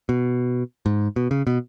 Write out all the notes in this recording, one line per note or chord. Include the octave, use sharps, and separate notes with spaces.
B2
G#2
B2
C#3
B2